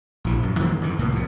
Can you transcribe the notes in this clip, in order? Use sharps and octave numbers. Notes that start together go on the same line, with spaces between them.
A#1 E3
F#2
G2 D#3 F3 A#3
F2 E3
C2 A2 A#3
F2 A#2